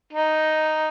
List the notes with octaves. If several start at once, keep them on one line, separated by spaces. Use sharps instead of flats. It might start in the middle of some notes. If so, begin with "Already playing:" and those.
D#4